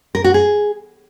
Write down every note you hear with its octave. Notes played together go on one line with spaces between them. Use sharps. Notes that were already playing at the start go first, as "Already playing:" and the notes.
A#4
F#4
G#4